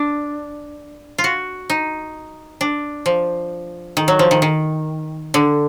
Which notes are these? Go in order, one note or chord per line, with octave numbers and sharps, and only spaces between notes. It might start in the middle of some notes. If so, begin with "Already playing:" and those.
Already playing: D4
F4
F#4
D#4
D4
F3
D#3
F#3
F3
D#3
D#3
D3